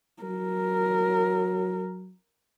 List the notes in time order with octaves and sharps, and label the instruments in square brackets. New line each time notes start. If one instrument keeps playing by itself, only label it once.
[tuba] F#3 [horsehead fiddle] A#4